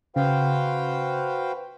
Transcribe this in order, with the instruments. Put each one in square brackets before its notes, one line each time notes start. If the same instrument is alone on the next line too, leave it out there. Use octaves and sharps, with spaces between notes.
[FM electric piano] C#3 [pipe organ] F#4 B4 [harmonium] C5 F5 G5